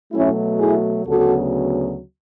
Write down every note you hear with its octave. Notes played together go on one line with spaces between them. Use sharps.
B2 F#3 A3 C#4 E4
E4 G#4
D2 C#3 F#3 B3 F#4 A4